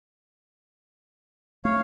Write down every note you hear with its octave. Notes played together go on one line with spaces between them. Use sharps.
A3 C#5 F5